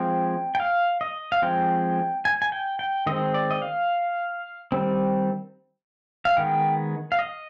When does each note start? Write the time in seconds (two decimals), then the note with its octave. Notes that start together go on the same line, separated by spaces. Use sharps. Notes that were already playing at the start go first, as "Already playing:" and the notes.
Already playing: F3 G#3 C4 G5
0.55 G5
0.60 F5
1.01 D#5
1.32 F5
1.42 F3 G#3 C4 G5
2.25 G#5
2.42 G#5
2.52 G5
2.79 G5
3.06 D#3 G#3 C4 D#5
3.34 D5
3.51 D#5
3.62 F5
4.72 D#3 G3 C4
6.25 F5
6.37 D#3 G#3 B3 G5
7.12 F5
7.19 D#5